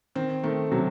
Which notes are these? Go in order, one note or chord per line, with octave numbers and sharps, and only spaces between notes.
D#3 C4
D#3 A3
C3 F#3